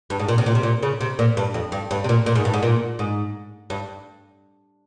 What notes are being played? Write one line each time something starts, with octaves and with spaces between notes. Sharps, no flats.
G2
G#2
A#2
C3
A#2
C3
A#2
C#3
C3
A#2
G2
F2
G2
G2
C3
A#2
A#2
G#2
G2
G#2
A#2
G#2
G2